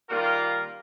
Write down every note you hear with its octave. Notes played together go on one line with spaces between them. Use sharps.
D#3 G3 A#3 F4 A#4